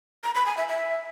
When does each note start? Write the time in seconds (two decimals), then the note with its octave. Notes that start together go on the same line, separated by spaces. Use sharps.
0.23 A#5
0.35 B5
0.46 G#5
0.57 E5
0.68 E5